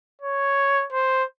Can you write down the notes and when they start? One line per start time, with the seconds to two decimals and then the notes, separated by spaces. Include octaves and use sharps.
0.22 C#5
0.92 C5